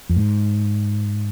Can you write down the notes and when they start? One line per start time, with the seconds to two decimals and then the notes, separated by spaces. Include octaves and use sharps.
0.09 F2
0.16 G#2